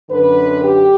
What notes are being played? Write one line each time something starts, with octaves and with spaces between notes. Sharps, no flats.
F#2 D3 B4
G4